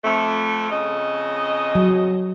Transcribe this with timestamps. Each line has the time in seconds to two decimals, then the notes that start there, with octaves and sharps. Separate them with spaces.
0.05 F2 A3
0.71 F2 C#3 D#5
1.75 F#3